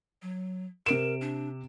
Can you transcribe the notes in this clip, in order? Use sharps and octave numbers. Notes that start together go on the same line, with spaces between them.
F#3
C3 A#4 D7 E7
D4